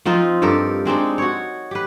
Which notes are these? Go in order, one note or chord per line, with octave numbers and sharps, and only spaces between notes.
F3 C4 D#4 F4
G2 G4 A4 A#4
G#3 C4 D4 D#4
F#4 C#5
G4 B4